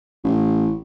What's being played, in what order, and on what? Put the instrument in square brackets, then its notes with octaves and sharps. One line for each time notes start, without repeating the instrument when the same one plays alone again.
[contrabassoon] A1